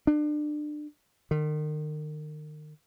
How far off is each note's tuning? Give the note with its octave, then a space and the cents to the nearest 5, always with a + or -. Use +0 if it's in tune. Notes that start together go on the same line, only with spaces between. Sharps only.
D4 +30
D#3 -35